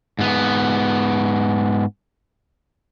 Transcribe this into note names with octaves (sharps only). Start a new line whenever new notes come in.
G#2 B3